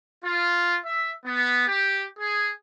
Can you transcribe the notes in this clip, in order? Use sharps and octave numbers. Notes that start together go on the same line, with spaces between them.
F4
E5
B3
G4
G#4